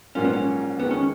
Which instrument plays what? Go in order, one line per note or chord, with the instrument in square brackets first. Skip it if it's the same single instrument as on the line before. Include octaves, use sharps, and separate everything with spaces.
[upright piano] A#1 G#2 F#3 A#3 F4 [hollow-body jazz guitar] C#4
[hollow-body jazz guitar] B3
C#4
[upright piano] F2 D#3 G#3 [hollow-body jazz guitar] B3
[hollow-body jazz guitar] C#4